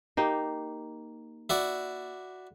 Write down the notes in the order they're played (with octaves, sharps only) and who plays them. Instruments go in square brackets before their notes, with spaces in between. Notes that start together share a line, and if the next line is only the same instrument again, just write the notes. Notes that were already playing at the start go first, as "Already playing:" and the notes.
[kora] A#3 D#4 G4
[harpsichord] E4 F#4 D5